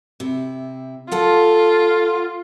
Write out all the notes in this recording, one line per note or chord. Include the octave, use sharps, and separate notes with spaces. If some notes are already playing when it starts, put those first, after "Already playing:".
C3 E4
F4 A4 F#5